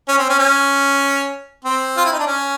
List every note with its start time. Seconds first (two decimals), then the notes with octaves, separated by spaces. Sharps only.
0.08 C#4
0.18 C4
0.29 C#4
0.39 C#4
1.64 C4
1.97 F4
2.05 E4
2.12 D#4
2.20 D4
2.26 C#4